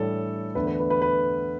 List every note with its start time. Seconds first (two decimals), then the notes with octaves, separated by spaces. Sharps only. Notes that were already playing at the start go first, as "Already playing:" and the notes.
Already playing: A2 E3 G3 D4 A4 C#5
0.55 E2 D3 A3 D4 B4
0.67 B4
0.79 B4
0.90 B4
1.02 B4